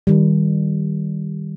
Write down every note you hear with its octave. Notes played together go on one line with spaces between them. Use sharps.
D#3 G3